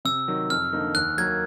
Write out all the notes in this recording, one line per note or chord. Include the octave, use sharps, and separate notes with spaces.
C3 E6
D#3 F#3
F2 F6
D3 F3 A#3 D#4
D#2 F#6
D#3 F#3 A#3 G#6